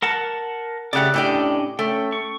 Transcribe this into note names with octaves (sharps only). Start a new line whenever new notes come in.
A#4 F#5 A5
C#3 A3 G4 D5 F#5
A2 C#4 D4 G4 D5 D#5
A3 C#4 G5
C#6